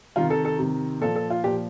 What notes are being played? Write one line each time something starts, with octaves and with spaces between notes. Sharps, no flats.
C3 D#3 F4
A4
A4
C3 D#3
A#2 F3 A4
A4
F4
A#2 F3 G4